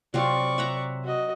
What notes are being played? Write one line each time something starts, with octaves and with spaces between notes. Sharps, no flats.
C3 F#3 C4 F4 D5 C#6
E5 F#5 A#5
F#4 D#5